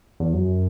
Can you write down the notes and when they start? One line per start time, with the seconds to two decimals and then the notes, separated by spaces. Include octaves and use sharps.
0.20 E2
0.33 F#2